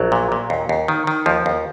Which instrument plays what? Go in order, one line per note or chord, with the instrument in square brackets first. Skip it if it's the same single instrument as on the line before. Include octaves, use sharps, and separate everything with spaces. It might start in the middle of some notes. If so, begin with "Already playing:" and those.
Already playing: [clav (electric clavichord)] A#1 F#3
A#2
A#2
D#2
D#2
D#3
D#3
D#2 F3
D#2